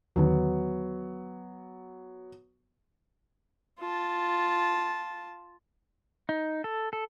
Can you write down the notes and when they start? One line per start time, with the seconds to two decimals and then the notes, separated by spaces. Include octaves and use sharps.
0.16 D#2 D3 D#3 F#3 B3
3.80 F4 A5
6.29 D#4
6.64 A4
6.93 A4